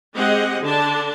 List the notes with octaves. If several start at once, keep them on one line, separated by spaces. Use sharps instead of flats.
G#3 C4 G4 G#4 D#5 F#5
D3 D4 A5